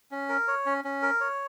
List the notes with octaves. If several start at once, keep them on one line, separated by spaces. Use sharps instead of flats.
C#4
A#4
C#5
C#4
C#4
A#4
C#5